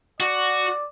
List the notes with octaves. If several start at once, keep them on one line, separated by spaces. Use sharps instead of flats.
F#4 D5